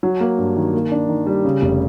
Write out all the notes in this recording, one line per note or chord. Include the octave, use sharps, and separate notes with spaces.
F#3
A#3
G2
D#3
A#3
D4
D#3
G3
C#3
F1